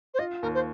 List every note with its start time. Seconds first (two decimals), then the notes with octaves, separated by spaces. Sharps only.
0.14 C5
0.19 F4 D#5
0.42 D#2 A#4
0.55 C5